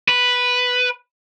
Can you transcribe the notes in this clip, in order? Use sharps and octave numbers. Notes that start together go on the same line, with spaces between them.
B4